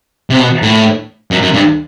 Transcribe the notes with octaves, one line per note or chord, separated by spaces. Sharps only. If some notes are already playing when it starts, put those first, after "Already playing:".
C3
B2
A2
F#2
F#2
G2